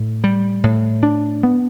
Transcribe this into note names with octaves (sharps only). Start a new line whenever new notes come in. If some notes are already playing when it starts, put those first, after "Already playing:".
Already playing: A2
G3
A2
D4
B3